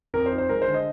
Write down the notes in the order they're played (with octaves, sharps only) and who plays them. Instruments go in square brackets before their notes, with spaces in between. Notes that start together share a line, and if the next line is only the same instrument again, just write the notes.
[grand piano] F2 A#4
C5
D#4
C5
G#3 A#4
C5
D3
D#5